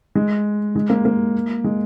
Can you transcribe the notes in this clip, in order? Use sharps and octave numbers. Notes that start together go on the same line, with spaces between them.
G#3
G#3
A#3
A#3
G#3